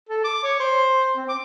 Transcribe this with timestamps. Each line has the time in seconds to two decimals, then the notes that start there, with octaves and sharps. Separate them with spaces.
0.09 A4
0.24 D6
0.43 C#5
0.60 C5
1.17 C4
1.29 D6